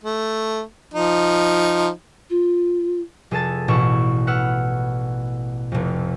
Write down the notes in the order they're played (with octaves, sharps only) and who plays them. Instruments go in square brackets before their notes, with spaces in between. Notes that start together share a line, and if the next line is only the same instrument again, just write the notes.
[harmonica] A3
F3 D#4
[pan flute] F4
[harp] F1 G#4 A4 A5 A6
A1 B2 E4 A4 C#6 E7
B4 F#5 E6 F6
F1 F2